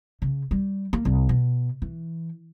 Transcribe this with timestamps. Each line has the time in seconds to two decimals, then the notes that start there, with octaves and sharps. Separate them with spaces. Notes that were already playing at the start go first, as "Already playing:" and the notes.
0.22 C#3
0.51 G3
0.93 A#3
1.05 C2
1.29 B2
1.82 E3